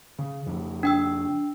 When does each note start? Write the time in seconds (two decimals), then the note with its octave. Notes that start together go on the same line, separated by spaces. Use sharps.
0.19 C#3
0.46 F2 C#3 F3
0.83 D4 G5 E6